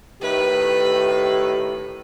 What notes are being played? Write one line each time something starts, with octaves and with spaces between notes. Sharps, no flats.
A2 D#3 G4 B4